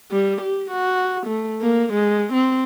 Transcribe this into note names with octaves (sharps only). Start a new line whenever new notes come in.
G3
G4
F#4
A3
A#3
G#3
C4